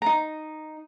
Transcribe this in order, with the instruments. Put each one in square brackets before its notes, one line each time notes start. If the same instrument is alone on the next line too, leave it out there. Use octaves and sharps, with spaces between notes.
[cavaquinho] D#4 A#5